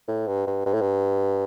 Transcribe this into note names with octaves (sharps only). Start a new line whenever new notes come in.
A2
G2
G2
G2
A2
G2